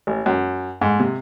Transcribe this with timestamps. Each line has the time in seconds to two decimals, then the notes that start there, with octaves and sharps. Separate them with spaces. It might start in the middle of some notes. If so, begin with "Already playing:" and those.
0.07 A1
0.26 F#2
0.81 G#2
1.00 C3